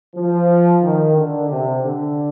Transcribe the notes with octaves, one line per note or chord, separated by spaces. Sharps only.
F3
D#3
D3
C3
D3